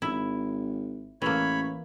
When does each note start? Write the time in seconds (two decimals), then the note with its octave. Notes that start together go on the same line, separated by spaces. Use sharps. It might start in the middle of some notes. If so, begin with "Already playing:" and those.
0.02 G#1 E4
1.22 A1 E3 A#3 C#5 B5